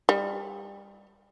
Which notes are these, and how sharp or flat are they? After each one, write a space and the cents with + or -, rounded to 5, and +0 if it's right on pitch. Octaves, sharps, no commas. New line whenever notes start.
G3 +30